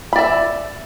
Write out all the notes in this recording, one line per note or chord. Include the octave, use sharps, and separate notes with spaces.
D5 E5 B5